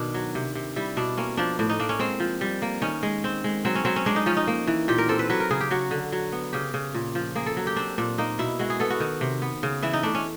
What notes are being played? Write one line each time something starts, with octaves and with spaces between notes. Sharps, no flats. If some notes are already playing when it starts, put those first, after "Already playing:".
Already playing: B2 D#3 B3 D4
F#3
C3
C3
G3 E4
B2 D4
A#3 C#4
F3 D4
A2 D4
D#4
A#3 D4
C#4
G#3 C4
F3
G3
A#3
D#3 C#4
G#3
C4
G#3
F#3 C4
C#4
F#3 C4
C#4
G#3 D4
D#4
F3 C#4
D#4
A#3
E3
A#2 G4
A#4
C4 A4
B4
F#3 B4
A#4
C#3 G#4
G4
F#3 F#4
D3
F#3
B3
C#3 G4
C#3
A#2
F3
A#3 G#4
A4
F#3
G4
C4 D4
A#2 D4
A#3 D#4
B2 E4
G#3 F#4
G#4
B3 A4
F#4
D#3
C3
B3
C#3
E3 E4
D#4
A3 D4
C#4